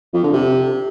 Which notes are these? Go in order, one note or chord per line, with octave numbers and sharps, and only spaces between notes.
F2
D3
C3